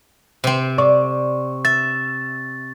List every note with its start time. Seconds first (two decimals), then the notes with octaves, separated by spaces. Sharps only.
0.44 C3 C4
0.78 D5 C#6
1.65 E5 A6